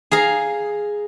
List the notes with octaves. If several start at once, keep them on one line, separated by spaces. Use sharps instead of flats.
G#4 F5 A#5